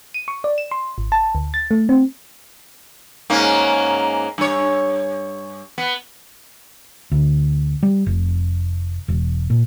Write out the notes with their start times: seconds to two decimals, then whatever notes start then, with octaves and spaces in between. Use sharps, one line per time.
0.14 D#7
0.28 C#6
0.44 D5
0.58 E7
0.71 C6
0.98 G#1
1.12 A5
1.35 D2
1.54 A6
1.71 A3
1.89 C4
3.30 G#2 A#3 C#4
4.38 G2 C#5
5.78 B3
7.12 D2
7.83 G3
8.06 F1
9.08 E1
9.50 A#2